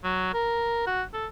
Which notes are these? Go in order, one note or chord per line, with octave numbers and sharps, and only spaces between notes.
F#3
A#4
F#4
A4